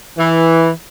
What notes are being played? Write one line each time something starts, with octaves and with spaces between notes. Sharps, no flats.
E3